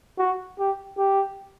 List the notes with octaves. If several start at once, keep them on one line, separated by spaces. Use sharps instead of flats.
F#4
G4
G4